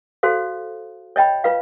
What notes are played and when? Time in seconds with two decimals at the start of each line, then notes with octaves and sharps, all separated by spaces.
0.23 F#4 A4 C5 F5
1.16 C#5 D#5 G5 B5
1.44 F4 B4 F5